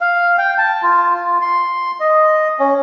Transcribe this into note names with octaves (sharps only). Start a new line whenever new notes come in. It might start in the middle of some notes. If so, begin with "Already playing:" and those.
F5
G5
A5
F4
F4
C6
D#5
C#4